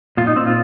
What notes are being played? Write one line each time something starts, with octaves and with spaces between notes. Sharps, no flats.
A#2 F4
D#4
A#2 C4
F4